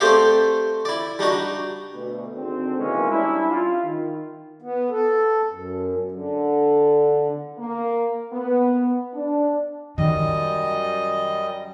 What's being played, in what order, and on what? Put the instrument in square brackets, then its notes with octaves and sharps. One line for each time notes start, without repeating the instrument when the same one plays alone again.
[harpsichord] A3 C4 G4 D5 E5 F5
E4 D5
G3 D4 D#4 F#4
[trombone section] D2 B2
G#1 D3 C4
B2 D#3 E3 G#3 A#3 C#4
G3 C#4 D4 E4
F4
D#3
[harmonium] B3
A4
F#2
D3
[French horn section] A#3
B3
D4
[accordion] F#2 G3 D#5 [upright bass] D#3